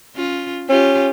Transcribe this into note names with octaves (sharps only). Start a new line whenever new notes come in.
C#4 F4
C#4 F4 G4